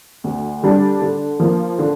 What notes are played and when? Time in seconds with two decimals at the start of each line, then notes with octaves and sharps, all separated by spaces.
0.24 D2
0.63 D3 G3 D4
1.01 D3
1.40 F3 A#3
1.79 D3